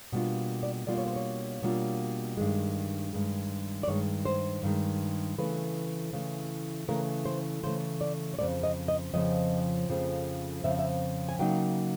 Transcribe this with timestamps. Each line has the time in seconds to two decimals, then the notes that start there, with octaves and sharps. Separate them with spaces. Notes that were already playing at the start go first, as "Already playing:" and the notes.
0.12 B2 G3 A#3 D4 F4
0.63 D5
0.87 B2 G3 A#3 D4 F4 D5
0.98 C#5
1.07 C5
1.16 C#5
1.62 B2 G3 A#3 D4 F4
2.37 G2 D#3 G#3
3.13 G2 D#3 G#3
3.83 D5
3.88 G2 D#3 G#3 C#5
4.25 C5
4.63 G2 D#3 G#3
5.38 C#3 E3 A3 B4
6.13 C#3 E3 A3
6.88 C#3 E3 A3 A#4
7.25 C5
7.63 C#3 E3 A3 C5
8.01 D5
8.34 C#5
8.38 F2 C#3 F3 A3 C4 D5
8.63 D#5
8.88 D#5
9.14 F2 C#3 F3 C4 D#5
9.89 F2 C#3 F3 A3 C4
10.64 F2 C#3 F3 C4 E5
10.71 F5
10.79 E5
11.29 G#5
11.39 C#3 F#3 A#3 D#4 G5